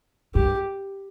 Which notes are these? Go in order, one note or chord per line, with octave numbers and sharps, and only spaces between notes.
G2 G4